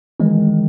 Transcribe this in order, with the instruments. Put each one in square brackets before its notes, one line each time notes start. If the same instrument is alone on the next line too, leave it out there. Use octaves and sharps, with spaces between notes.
[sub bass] D#3 [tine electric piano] E3 G#3